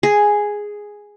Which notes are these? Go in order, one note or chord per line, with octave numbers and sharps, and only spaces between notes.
G#4